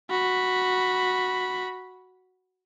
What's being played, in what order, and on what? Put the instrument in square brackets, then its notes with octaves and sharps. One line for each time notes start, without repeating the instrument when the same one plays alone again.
[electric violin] F#4 B5